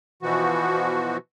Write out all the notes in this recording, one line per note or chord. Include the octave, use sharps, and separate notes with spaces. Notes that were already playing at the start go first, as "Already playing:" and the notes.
B2 E3 F3 F#4